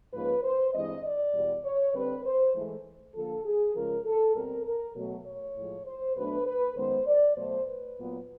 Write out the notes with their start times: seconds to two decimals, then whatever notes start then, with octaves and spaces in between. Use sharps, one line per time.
0.13 G#2 F3 A#3 C#4 B4
0.43 C5
0.73 G2 E3 G#3 C4 D#5
1.04 D5
1.34 E2 B2 G3
1.64 C#5
1.94 D3 G3 C4 B4
2.25 C5
2.55 G#2 E3 A3
3.15 D3 F3 A#3 A4
3.45 G#4
3.75 C#3 F3 G#3 A#4
4.06 A4
4.35 B2 G3 C4 A#4
4.65 A#4
4.96 B2 F#3 A3
5.26 C#5
5.56 A2 F3 G#3
5.86 C5
6.16 B2 F#3 A3 D4 B4
6.46 B4
6.77 F#2 D#3 G#3 B3 C5
7.07 D5
7.37 B2 F#3 A3 C5
7.67 B4
7.97 A#2 F#3 B3